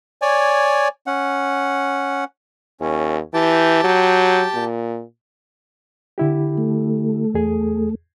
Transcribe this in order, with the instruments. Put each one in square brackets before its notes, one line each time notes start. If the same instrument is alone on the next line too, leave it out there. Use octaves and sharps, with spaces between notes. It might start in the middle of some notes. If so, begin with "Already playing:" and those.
[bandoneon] C#5 D5 G#5
C#4 F#5
[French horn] D#2 [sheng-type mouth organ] C#4
[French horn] E3 [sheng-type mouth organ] G4 G5 A5
[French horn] F#3
A#2
[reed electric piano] D3 E4 G4
[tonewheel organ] A3
[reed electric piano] E2 G#4